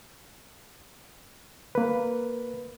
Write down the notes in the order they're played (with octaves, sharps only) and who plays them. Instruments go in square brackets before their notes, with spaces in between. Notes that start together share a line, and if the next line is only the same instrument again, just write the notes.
[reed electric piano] A#3 B4